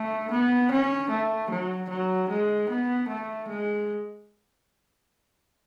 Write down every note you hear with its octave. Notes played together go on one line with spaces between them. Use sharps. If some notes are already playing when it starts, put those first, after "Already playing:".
Already playing: A3
B3
C#4
A3
F#3
F#3
G#3
B3
A3
G#3